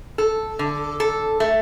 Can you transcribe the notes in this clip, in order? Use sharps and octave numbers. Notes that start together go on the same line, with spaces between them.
A4
D3
A4
A3